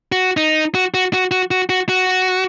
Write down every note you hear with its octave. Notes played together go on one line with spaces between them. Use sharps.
F#4
D#4
F#4
F#4
F#4
F#4
F#4
F#4
F#4